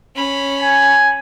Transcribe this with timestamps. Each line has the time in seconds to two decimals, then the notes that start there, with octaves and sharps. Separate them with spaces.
0.16 C#4 B5
0.61 G#5